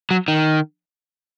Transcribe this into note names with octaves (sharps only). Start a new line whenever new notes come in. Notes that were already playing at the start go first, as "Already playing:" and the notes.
F#3
D#3